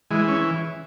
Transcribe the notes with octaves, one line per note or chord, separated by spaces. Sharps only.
E3 G#3
C#4